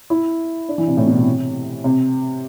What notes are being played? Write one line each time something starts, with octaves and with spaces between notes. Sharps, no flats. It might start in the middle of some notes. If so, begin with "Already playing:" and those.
E4
D4
E3
C3
A2
B2
C3
C3